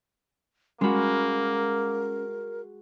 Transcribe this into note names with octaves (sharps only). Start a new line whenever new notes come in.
G#3 A#3 C#4 F#4 A#4 B5